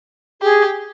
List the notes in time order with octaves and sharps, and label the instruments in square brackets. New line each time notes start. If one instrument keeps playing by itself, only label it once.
[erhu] G4 [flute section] G#4